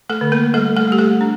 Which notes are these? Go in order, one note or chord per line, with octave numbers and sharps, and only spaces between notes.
A3 A4
D3
A#3 A#4
G3 A3 A4
A3 A4
G3 G4
A3 A4
D4